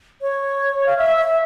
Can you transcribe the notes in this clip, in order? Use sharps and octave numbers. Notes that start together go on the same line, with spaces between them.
C#5
F5
E5
E5